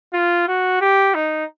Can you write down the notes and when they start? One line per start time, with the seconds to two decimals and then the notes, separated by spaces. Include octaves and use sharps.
0.13 F4
0.48 F#4
0.81 G4
1.14 D#4